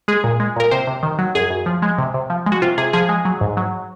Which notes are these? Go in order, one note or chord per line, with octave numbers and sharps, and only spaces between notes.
G#3 G#4
A#2
G#3
A#2 A#4
C3 C5
C3
D#3
F#3
F#2 G#4
F#2
F3
G#3
C3
C3
F3
G#3
F#4
C3 F4
C3 G#4
F3 G#4
G#3
F#3
G#2
F#3